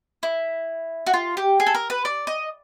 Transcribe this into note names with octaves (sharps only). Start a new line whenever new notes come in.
E4
F#4
F4
G4
G#4
A4
A#4
B4
D5
D#5